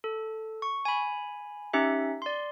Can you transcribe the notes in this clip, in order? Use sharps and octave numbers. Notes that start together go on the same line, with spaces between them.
A4
C#6
G#5 B5
C#4 D#4 G4 E5
D5 C6